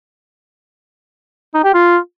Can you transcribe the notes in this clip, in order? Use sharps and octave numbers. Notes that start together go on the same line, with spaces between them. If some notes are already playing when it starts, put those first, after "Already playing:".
D#4
G4
F4